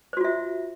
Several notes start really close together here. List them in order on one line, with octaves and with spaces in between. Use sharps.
C5 F#4 F4 E5